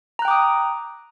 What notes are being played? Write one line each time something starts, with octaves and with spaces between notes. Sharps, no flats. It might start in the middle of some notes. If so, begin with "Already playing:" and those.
G5 A#5 D6 D#6 F#6